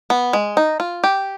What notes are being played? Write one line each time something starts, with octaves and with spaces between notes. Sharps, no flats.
B3
G#3
D#4
F4
G4